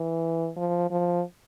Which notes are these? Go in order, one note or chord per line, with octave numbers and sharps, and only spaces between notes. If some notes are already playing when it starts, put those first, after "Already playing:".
Already playing: E3
F3
F3